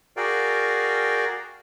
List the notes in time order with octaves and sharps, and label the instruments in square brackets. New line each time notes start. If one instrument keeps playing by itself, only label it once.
[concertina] F#4 G#4 A#4 D5 F5 G5